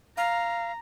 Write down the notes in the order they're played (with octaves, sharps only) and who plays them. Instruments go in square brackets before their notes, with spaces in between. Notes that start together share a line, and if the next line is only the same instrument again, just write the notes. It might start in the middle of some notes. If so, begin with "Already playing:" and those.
[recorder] F5 [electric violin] A#5